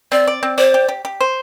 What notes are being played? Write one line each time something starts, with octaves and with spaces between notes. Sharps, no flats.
C4 D5
D5
C4
C5 D5
G4
G4
G4
C5